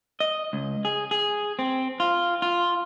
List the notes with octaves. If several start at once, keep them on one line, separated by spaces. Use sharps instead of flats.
D#5
C#2
G#4
G#4
C4
F4
F4